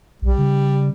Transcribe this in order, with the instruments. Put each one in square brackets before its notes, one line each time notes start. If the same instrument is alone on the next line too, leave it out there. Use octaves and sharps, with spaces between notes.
[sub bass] B1 [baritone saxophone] G3
[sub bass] C#3